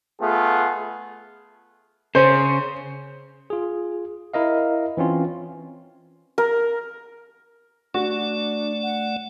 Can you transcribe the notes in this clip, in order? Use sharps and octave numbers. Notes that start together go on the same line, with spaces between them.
A3 B3 F4 G#4
C#3 C#4 C5
F4 G#4
E4 A#4 D#5 F5
E3 C4 C#4 F4
A#4
A3 D4 F#4 D5
F#5